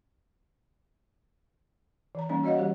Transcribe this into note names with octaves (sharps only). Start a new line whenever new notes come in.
E3 A#5
E3 G3 A#3 C#4 D#4
F#4 C#5 D#5 F5 F#5
E3 G3 G4 C5